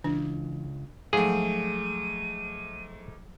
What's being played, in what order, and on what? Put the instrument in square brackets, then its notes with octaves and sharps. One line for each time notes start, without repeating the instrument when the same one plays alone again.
[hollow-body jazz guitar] C#2 [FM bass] E3 [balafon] D4
[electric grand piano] G#2 A3 [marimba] F3 F#3 [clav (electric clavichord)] G#4 [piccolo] D#7